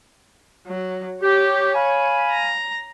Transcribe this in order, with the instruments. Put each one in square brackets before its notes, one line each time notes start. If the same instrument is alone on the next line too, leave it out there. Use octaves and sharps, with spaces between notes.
[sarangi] F#3
[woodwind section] G4 [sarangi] C#5
[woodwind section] F5 G#5 B5
[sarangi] A#5